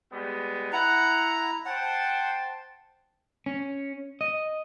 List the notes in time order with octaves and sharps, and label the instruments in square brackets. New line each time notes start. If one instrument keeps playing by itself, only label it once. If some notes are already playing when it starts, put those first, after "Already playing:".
[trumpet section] G3 G#3 B3
[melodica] E4 A#5 [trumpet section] F#5
[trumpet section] C5 G5 A5 [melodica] F#5
[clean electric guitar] C#4
D#5